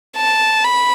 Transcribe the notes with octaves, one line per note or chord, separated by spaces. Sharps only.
A5
B5